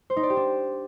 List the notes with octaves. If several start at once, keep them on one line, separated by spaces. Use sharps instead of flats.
C5
D#4
D5
G4
D4